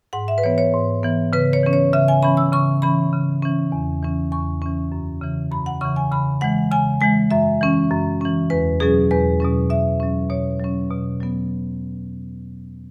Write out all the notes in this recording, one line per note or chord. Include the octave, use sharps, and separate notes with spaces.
G#2 F#5
E5
B4
E3 B3 C#5
C#5
G#2
E3 B3
C#3 B4
C#5
E3 C#4
C#5
C#3 E5
G#5
E3 C#4 B5
E6
C#3 C#6
E3 C#4 B5
C#3
E3 C#4
E2
E3 C#4
E2 C#6
E3 C#4
F#2
C#3 E3
F#2 B5
F#5
C#3 E3 C#6
G#5
C#3 B5
E3 G#3 F#5
C#3 G#5
E3 G#3 G#5
F#2 E5
E3 C#4
F#2
E3 C#4
E2 B4
B2 F#3 C#4 G#4
E2 B4
B2 F#3 C#4
B2 E5
F#3 C#4
B2 C#5
F#3 C#4
B2
F#3 B3